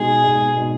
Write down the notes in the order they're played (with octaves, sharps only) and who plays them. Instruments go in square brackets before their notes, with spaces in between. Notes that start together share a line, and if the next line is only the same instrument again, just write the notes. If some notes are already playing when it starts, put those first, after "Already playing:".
Already playing: [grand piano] B2 G#3 D#4 [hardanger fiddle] G#4
[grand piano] B2 G#3 D#4
B2 G#3 D#4